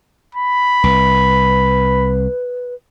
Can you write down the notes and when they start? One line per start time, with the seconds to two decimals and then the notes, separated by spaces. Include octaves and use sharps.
0.35 B5
0.84 C2 B4